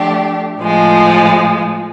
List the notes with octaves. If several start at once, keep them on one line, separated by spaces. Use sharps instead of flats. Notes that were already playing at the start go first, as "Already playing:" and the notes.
Already playing: F3 A3 D4 G4
A2 F3 G#3